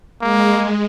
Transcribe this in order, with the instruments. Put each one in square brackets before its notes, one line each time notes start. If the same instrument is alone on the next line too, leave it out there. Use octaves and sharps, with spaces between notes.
[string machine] G#3 [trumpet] A#3